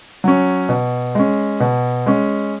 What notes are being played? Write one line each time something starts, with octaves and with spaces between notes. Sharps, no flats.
F#3 C#4
B2
G#3 C#4
B2
G#3 C#4